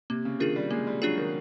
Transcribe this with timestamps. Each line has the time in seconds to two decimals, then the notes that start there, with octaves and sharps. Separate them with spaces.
0.10 C3 A#3
0.25 C#3
0.40 D#3 D4 F4 G#4
0.56 G3
0.71 G#3 A#3
0.87 G3
1.02 F#3 D4 F4 G#4
1.18 D#3